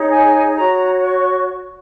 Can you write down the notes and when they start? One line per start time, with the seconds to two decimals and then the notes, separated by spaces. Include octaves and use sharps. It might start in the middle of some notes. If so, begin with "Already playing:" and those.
Already playing: D#4 G#4 C#5
0.09 G#5
0.56 F#4 C#5 A#5
1.03 C#6